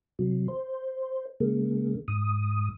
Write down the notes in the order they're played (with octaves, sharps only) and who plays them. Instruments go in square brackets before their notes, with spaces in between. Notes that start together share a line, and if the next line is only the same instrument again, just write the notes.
[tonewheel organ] C3 F#3
C5
C#3 G#3 A#3
G#2 D#6